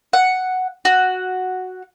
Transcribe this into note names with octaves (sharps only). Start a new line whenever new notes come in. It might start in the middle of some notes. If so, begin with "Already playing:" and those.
F#5
F#4